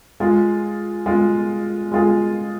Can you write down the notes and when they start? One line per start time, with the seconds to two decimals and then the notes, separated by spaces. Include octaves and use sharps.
0.20 G#3 F4 G#4
1.06 G#3 F4 G#4
1.92 G#3 F4 G#4